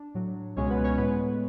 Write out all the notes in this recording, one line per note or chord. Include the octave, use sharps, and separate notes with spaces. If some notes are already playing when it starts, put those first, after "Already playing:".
Already playing: D4
A2 F#3
C#2 B2 G#3 C#4 C#5
B3 B4
C#4 C#5
A2 G#3 B3 B4